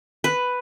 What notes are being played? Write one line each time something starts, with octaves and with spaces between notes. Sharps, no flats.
B4